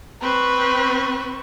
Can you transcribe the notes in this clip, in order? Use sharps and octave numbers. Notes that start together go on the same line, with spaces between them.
C4 B4 C#6